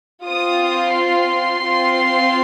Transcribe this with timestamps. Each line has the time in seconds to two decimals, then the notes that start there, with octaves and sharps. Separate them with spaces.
0.24 C4 F4 D#6
0.94 C6
1.64 C4 F4